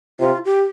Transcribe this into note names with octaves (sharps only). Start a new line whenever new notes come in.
C3 F4
G4